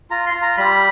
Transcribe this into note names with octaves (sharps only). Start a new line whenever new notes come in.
F4 A#5
C6
F4
A#5
G3 B5